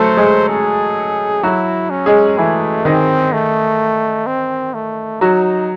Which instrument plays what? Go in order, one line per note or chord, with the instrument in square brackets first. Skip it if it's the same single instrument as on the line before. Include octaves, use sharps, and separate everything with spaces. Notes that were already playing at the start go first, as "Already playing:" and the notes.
Already playing: [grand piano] F#3 A3 A4 [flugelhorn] C5
[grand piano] G#3 G#4
[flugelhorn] G#4
[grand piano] F#3 F#4 [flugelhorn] E4
[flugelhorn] C#4
[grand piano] G#3 G#4
[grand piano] E3 E4 [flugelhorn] A3
[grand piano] D#3 D#4 [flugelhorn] C4
[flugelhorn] A3
C4
A3
[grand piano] F#3 F#4 [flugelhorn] D#4